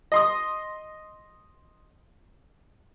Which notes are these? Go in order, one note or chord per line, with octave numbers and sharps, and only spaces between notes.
D#5 C6 D#6